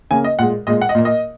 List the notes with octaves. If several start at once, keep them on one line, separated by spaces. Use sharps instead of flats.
C#3 A#3 G#5
D#5
A#2 G#3 F#5
A#2 G#3 D#5
F#5
D#5
A#2 A#3
D#5